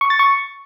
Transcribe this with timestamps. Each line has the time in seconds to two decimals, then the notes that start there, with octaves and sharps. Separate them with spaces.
0.01 C#6
0.10 A6
0.19 C#6